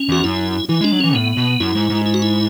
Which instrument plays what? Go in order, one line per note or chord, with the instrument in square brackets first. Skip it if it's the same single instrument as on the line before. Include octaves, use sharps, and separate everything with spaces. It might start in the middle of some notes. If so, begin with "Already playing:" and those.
Already playing: [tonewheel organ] C#4
[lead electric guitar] E2 [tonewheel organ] F#4
[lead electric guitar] F#2 [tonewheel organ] E4
[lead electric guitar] E3 [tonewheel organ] E4
[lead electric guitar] G#3 [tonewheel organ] D4
[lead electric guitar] F#3
[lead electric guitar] E3 [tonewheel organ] C#4
[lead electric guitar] A2 [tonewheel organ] B3
[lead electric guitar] B2
[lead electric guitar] F#2 [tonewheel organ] E4
[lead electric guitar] G#2
G#2
[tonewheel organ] E4
F#4
E4